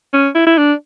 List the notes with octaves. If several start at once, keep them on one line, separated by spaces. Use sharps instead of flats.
C#4
E4
E4
D4